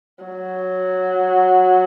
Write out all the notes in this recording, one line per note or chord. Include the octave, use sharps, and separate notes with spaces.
F#3